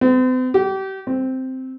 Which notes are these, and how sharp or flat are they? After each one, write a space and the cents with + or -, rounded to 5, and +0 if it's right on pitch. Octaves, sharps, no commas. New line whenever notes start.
C4 -45
G4 -30
C4 -5